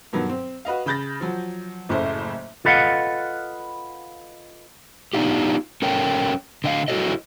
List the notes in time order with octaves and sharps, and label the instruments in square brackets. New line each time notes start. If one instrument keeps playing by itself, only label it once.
[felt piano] G2 B2 D#3 F#3
C4
F#4 B4 D#5 F5
C#3 B5 G6 A6 A#6
F3 F#3
F#1 A2 C#3 A3 C5
[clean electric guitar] F4 A4 B4 D#5 F5 F#5
[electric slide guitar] B3 D4 D#4 F4 G4
C#4 A4 A#4 C#5 G5
D3 D#5 F5
E4 F#4 G#4 A4 C#5 D#5